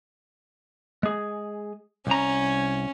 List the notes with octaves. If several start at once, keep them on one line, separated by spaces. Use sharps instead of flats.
G#3 G#4
C2 C#4 A#5